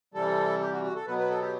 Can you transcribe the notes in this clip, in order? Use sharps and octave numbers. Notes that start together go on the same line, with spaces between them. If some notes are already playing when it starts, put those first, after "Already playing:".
C3 E3 G3 A4
G4
F#4
F#4
A4
B2 F#3 B3 B4
B4
A4
G4